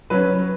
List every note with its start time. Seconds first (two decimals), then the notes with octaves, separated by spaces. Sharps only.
0.10 F#3 C#4 B4